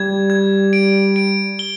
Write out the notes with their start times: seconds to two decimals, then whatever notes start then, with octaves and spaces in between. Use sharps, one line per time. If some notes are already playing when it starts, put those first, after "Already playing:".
Already playing: G3 G#6
0.30 G#6
0.73 D7
1.16 D7
1.59 G7